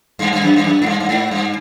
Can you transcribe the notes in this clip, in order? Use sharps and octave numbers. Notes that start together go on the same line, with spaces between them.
G2
G2
F#2
G2
F#2
G#2
G2
G2
G#2
G2